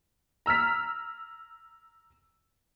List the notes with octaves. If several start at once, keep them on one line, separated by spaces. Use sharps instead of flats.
A#5 E6 F6 B6